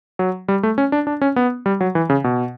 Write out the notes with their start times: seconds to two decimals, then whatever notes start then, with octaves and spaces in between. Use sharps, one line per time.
0.19 F#3
0.48 G3
0.63 A3
0.78 C#4
0.92 D4
1.07 D4
1.21 C#4
1.36 B3
1.66 G3
1.81 F#3
1.95 E3
2.10 C#3
2.24 B2